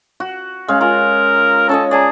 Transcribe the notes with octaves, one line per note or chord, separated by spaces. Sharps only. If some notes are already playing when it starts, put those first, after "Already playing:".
F#4
G#3 C#4 F5
F4 A#4
C#4 A4 C#5 D#5
G#4 D5 A5 A#5